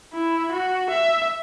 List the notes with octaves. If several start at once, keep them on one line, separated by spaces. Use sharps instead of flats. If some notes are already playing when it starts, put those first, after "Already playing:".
E4
F#4
E5